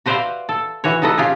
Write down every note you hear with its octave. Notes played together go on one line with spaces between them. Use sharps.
F#4 B4 C5 D5 E5 F5
A4
E3 F#4 C#5
D#4 F#4 A4 B4 D#5
C#4 F4 G4 G#4